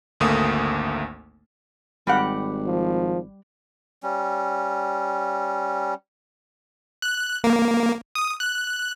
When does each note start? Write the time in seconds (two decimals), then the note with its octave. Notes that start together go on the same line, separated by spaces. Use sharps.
0.20 G#1 D2 A3 A#3 D#6
2.07 G#1 G3 G4 F#5
2.67 F3
4.03 G3 C#4
7.02 F#6
7.44 A#3
8.15 D#6
8.40 F#6